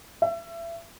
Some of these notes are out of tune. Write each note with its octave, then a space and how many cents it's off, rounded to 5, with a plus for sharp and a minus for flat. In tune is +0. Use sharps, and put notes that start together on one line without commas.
E5 +30